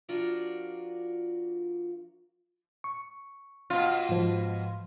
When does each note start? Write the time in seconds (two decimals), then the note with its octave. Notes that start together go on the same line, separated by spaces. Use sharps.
0.09 F3 D4 F4 F#4 A#4 D5
2.84 C#6
3.70 B2 F4
4.09 G#2 F3